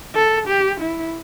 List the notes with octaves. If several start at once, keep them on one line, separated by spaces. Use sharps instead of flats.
A4
G4
E4